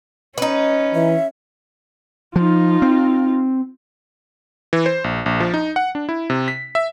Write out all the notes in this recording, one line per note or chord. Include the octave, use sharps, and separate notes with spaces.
C#4 D#4 B4
E3 E5
F3 D#4 F4
C4
E3
C5
A#1
A#1
F3
D#4
F#5
D4
E4
C3
B6
E5